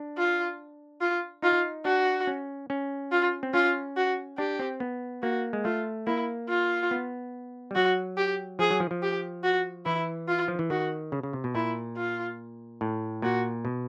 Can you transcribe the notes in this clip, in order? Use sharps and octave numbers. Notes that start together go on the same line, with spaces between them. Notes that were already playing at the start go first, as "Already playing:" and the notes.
Already playing: D4
F4
F4
D#4 F4
D4 F#4
C#4
C#4
F4
C4
C#4 F4
F#4
D4 G4
C4
B3
A#3 F#4
G#3
A3 F4
A#3 E4
F4
B3
G3
F#3 F#4
G4
F3 G#4
F#3
F3
F3
G4
F#4
E3 E4
F4
F3
E3
D#3 F#4
C#3
C#3
C3
B2
A#2 E4
F4
A2
A#2 F#4
B2